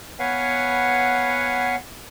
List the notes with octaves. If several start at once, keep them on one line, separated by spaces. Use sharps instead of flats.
B3 B4 C#5 F5 F#5 G#5